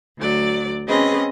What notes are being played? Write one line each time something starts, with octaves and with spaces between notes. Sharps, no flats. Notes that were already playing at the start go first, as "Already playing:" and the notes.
D2 F#3 D5
C4 C#4 G#4 B4 D#5